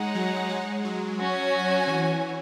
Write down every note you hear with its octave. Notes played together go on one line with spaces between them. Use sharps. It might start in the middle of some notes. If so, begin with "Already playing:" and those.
Already playing: G#3 D#4 G#4 C#5 F#5
F#3
G#3
F#3
C#4 F#4 C#5 G#5
E3